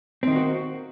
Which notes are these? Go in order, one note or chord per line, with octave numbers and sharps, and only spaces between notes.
D#3 A#3 C4 F#4